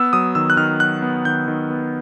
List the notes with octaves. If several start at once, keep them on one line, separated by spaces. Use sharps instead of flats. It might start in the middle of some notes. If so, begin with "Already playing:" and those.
Already playing: B3 E6
F#3 D#6
D#3 E6
F#6
D#3 F6
F#3 F#6
B3
D#3 G6
D#3
B3